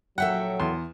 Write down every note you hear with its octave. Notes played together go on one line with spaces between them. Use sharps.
A#1 F#3 A4 E5 F#5 G5
E2 C6